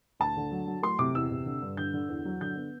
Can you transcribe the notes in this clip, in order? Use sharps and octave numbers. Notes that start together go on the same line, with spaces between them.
D2 A5
D3
F#3
F#3
A3 C6
C3 D6
E2 E6
C3
D3
G2
D3 G6
D3
E2
F#3
D3 G6
B3